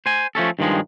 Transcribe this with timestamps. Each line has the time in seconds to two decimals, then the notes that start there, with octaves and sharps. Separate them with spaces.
0.06 C5 G#5
0.35 F3 A3 C#4 A4
0.59 G2 D#3 F3 G#3